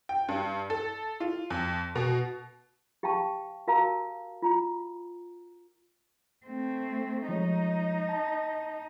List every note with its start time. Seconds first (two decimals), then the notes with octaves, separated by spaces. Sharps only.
0.09 G5
0.29 G2
0.70 A4
1.20 F4
1.50 F2
1.96 B2
3.03 G4 F5 G5 A5 C#6
3.68 F#4 A#4 F5 A5 A#5
4.42 F4 A#5
6.46 A3 C4
7.29 F3 G#3 D#4 C#5
8.09 A5